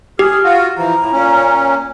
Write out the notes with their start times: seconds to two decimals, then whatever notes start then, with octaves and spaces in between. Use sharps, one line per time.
0.19 G4 G#4 F6
0.44 F4 F#4
0.78 E3 F3 A#5
0.98 A2
1.12 A#2 C#4